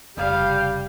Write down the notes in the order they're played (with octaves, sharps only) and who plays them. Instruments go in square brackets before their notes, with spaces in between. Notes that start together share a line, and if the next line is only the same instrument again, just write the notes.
[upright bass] F1 C#3 [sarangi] G3 [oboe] G4 [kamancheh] F5